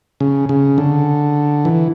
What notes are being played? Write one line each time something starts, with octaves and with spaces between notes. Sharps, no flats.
C#3
C#3
D3
E3